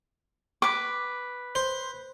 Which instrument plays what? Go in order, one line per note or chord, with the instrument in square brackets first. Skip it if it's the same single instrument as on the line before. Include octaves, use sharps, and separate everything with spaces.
[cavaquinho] B4 D6
[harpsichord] C5